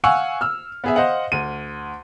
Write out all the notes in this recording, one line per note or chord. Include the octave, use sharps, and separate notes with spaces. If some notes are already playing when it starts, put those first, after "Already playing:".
F5 F#5 G#5 C#6 E6
E6 F6
B3 G#4 E5
C5 D#5 F5 F#5
D2 D#7